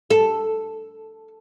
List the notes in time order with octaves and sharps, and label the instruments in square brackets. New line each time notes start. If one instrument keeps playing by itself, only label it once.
[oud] A4